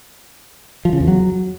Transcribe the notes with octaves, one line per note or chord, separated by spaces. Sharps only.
F3
C#3
E2
F#3